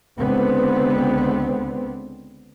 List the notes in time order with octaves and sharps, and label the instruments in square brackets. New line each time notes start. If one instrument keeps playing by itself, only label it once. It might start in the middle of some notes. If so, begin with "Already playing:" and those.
[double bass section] C#2 D3 B3 C4